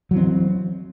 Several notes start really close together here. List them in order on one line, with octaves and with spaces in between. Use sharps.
F#3 E3 C4